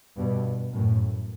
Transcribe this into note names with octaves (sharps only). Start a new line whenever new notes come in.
G2 B2
F#2 A2